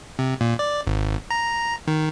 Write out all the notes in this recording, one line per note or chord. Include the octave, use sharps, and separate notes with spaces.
C3
A#2
D5
G#1
A#5
D#3